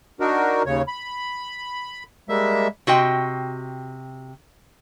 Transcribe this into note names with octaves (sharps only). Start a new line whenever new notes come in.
D4 D#4 F#4 A#4
D#2 C#3 C#5
B5
G3 G#3 A#3 E5
C3 F#4 D#5 G5